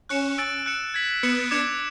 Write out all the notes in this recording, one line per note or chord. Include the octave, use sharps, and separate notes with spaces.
C#4 F#6 C#7 E7
E6 A6 D7 F#7
F#6 C#7 E7
G#6 B6 F#7
B3 F#6 C#7 E7
D4 D6 G#6 C#7 E7